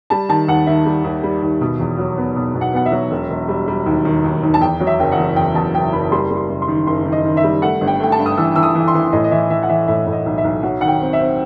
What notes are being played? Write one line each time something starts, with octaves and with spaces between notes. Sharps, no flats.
G3 A5
D#3 A5
D#2 F#5
D#3 E5
G3
D#2
G3
D#2
B2
E2
F#3
B3
B2
B2
F#5
B3 F#5
E5
F#3
E1
E1
G3
G3
D#2
D#3
D#2
D#2
A5
E2 G5
F#3
E5
F#1 G5
F#5
E2
E2 G5
E2 A5
F#1 G5
F#1 B5
G3 C6
G3
C6
F#1
C6
D#3
F#1 C6
D#3
D#5
D#3
E5
G3
A3 F#5
G1
G5
A3 G5
A5
G2
D#6
E3 E6
E3 E6
D#6
E3
C6
E3
A2 D#5
D#5
E3 E5
E3 E5
F#5
E3 E5
A2 E5
A2
D#5
B1
E5
B1
F#3 F#5
D#3 F#5
G5
C4
E5
C4